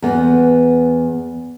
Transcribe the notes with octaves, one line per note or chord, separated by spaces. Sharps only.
E2 B3